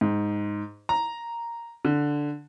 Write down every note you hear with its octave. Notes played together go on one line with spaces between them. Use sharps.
G#2
A#5
D3